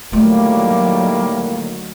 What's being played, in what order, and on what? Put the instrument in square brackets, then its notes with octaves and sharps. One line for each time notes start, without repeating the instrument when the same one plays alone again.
[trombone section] A2 G3 A#3 [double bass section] D3 D#3 F#3 [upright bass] A3 F4